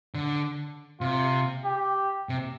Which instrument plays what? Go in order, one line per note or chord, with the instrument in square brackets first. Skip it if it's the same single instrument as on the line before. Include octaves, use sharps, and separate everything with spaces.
[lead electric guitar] D3
[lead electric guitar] C3 [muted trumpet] F4
[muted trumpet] G4
[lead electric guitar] C3